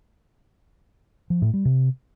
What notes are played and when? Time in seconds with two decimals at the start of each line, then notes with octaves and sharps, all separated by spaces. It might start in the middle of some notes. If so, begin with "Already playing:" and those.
1.30 F3
1.42 A2
1.54 G3
1.65 C3